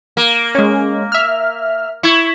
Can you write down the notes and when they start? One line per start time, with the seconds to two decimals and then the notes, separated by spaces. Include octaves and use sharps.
0.17 A#3
0.55 G#3 C#4
1.12 E5 F6
2.03 E4 C#6 G#6